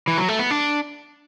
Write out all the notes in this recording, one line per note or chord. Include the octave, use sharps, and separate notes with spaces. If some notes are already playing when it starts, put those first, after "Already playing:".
E3
F#3
A3
B3
D4